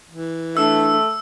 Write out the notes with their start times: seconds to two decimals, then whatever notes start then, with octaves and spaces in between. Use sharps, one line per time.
0.12 E3
0.57 A3 D4 E6